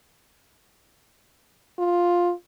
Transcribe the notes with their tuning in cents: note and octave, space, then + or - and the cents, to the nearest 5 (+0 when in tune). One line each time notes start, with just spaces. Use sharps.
F4 +5